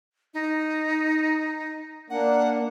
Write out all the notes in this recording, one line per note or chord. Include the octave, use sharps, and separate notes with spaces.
D#4
A#3 D4 F#5